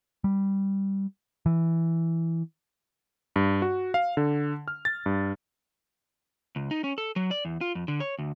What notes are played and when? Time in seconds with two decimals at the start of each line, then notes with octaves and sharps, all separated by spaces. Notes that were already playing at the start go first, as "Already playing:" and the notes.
0.24 G3
1.46 E3
3.36 G2
3.62 F#4
3.94 F5
4.17 D3
4.68 F6
4.85 A6
5.06 G2
6.56 C#2
6.71 D#4
6.84 C#4
6.98 A4
7.16 F#3
7.31 D5
7.45 E2
7.61 F4
7.75 F2
7.88 D3
8.00 C#5
8.19 D2